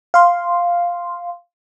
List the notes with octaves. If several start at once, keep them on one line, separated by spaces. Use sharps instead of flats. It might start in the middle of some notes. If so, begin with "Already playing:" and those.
F5 C6